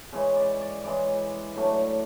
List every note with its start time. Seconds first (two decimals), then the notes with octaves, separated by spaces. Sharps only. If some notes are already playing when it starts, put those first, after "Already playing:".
0.12 C#3 E3 G#3 C#5
0.36 D5
0.61 D5
0.84 C#3 E3 G#3 D5
1.56 A2 F#3 A3 D4